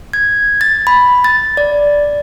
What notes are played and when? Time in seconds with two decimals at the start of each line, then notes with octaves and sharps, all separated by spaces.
0.13 G#6
0.61 A6
0.87 B5
1.24 A6
1.57 D5